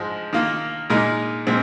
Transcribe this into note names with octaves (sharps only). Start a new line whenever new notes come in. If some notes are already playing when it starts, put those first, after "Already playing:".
Already playing: G#2 F3 G#3
D#3 A#3 F4
A#2 G#3 D#4 A#4
A#2 G#3 C4